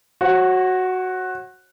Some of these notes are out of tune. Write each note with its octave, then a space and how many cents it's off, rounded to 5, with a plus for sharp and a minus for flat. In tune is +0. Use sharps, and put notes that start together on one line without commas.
F#4 +0 C#5 -40